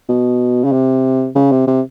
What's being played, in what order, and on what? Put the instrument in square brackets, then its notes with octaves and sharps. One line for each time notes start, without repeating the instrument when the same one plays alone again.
[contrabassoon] B2
C#3
C3
C#3
C3
C3